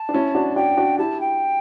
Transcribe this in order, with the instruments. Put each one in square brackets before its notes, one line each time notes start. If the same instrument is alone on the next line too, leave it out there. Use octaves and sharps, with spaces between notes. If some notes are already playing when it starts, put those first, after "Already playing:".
Already playing: [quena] A5
[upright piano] D4
C#4 E4
D4 F#4
[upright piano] D4 F#4 [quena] G5
[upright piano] D4 F#4
[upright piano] E4 G4 [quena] A5
[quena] G5